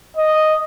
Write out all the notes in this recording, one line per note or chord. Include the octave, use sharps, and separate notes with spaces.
D#5